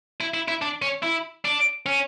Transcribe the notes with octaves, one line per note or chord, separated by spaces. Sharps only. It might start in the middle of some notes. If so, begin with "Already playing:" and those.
E4
E4
E4
D4
C#4
E4
D4
C#4